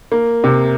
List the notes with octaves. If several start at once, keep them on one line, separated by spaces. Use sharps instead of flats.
A#3
C3